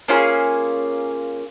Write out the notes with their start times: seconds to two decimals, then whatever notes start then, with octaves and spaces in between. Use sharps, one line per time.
0.08 A#3 C#4 F4 G#4